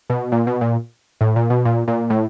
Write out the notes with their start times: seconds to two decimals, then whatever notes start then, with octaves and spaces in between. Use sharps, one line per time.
0.10 B2
0.32 A#2
0.47 B2
0.61 A#2
1.21 A2
1.36 A#2
1.50 B2
1.65 A#2
1.88 A#2
2.10 A2